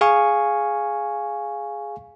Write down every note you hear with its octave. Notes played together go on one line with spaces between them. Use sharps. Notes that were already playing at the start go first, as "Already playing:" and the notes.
G#4 F5 G#5 C#6